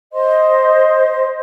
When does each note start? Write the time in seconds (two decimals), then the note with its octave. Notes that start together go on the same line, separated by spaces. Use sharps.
0.13 C5 D#5 C6